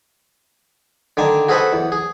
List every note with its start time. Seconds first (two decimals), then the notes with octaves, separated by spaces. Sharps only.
1.17 D3 D#3 G#5 A5
1.48 F#4 G#4 A4 B4 C5 F#5
1.73 E2
1.92 G#4